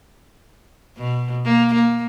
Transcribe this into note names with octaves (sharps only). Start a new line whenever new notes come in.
B2
A#3
A#3